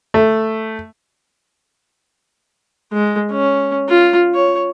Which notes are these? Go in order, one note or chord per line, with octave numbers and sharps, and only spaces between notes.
A3
G#3
C#4
F4
C#5